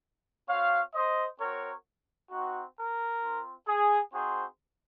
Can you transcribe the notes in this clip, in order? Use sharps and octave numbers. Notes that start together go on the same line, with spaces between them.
C4 F#4 C#5 F5
C5 D#5
C4 F#4 A#4 C#5
C4 D#4 F#4
A#4
C4 F4
G#4
C4 D#4 F#4 G#4 C5